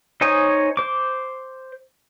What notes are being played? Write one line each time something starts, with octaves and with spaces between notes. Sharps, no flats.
D#4 C5 C#5 G#5 D#6
C5 D6